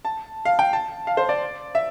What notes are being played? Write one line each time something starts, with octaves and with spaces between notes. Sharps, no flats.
A5
F5
G5
A5
F5
C5
D5
E5